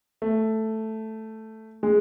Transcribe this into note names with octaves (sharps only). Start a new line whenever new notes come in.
A3
G#3